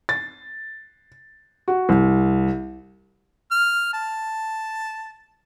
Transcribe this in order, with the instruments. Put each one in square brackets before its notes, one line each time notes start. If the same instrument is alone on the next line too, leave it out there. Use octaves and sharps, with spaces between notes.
[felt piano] A6
F#4
C2
[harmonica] F6
A5